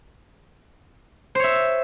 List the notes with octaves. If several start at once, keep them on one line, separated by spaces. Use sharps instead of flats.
C5 C#5 E5